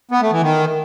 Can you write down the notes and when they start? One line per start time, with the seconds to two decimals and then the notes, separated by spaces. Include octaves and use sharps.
0.11 B3
0.21 A3
0.32 E3
0.42 D#3